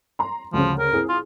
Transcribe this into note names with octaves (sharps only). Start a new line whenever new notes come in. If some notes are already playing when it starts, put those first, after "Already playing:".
A#5 C6
D2 C#3 F3
A#4
C4 E4 G#4
F4